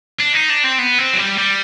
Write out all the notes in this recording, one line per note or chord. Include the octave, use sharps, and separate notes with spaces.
D4
D#4
D4
C4
B3
C4
F#3
G3
G3